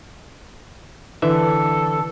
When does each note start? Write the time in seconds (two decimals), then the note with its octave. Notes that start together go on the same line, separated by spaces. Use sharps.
1.22 D3 E3 A4 E5